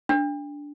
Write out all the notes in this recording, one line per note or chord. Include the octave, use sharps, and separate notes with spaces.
D4